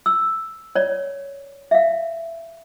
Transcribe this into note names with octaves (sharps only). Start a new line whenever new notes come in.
E6
C#5 D5
E5 F5